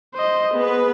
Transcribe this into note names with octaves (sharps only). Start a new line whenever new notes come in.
C5 D#5
B3 G#4 B4